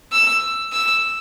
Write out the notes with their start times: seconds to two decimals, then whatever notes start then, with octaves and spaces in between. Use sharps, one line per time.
0.12 E6
0.73 E6